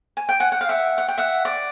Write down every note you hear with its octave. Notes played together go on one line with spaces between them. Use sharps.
G#5
G5
F#5 G#5
F#5
F5
E5 F#5
F#5
G5
E5 F#5
D5